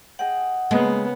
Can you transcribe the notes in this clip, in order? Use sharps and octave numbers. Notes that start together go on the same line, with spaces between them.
G#4 D#5 F#5 G5
C#3 G#3 A#3 B3